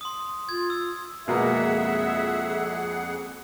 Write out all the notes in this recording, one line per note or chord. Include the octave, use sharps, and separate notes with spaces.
C6 D#6
F4 G#6
E6
F2 B2 G#3 A#3 G#4 E5 F#5